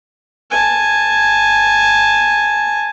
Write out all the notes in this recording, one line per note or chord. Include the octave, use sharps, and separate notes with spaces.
G#5 A5